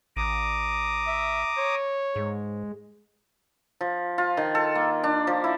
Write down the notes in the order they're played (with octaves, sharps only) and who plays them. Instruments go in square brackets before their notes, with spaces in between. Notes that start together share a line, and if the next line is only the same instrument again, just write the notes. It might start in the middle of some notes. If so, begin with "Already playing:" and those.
[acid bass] A1 [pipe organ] A#5 D6 D#6
[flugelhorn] E5
C#5
[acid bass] G#2 [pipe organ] G#3
[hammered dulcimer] F3
F4
D#3
A4
A#3
D4
F3
E4